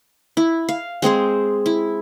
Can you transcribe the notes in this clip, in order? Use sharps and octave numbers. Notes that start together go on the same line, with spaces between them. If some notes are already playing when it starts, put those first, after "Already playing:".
E4
F5
G#3 C4 G#4 C5
E4